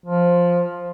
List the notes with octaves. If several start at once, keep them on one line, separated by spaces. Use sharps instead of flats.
F3